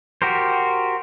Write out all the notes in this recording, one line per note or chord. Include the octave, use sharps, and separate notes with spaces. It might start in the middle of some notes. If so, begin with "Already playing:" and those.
F#4 G4 A#4 C5